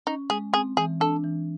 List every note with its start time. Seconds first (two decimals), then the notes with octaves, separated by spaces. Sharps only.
0.07 C#4 D#4
0.30 G#3 G#4
0.53 C4 G#4
0.77 E3 G#4
1.00 D4 A4
1.24 E3